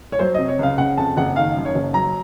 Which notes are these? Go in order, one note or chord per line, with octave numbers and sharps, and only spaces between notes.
C#5
F#3 C5
C3 D#5
C#5
C#2 F5
C#3 F#5
F2 A5
F#1 F#5
D#3 F5
F#2
C#5
F#1
F#3 A#5